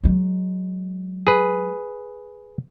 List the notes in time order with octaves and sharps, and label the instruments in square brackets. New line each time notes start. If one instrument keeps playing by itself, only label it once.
[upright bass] F#3 G#3
[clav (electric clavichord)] G#4 B4